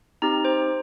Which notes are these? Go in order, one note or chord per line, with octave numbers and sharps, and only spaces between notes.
C4 D#4 G4 A#5
C5